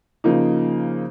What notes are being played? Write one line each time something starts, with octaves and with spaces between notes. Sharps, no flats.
C#3 F3 A#3 D#4